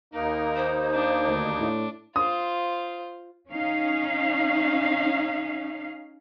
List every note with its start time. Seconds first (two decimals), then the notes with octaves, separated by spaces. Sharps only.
0.14 D#2 A#3 D#4 A#4
0.56 C5
0.95 D4
1.27 D2
1.59 A2
2.16 F4 C5 D#6
3.50 C#4 D#4 F5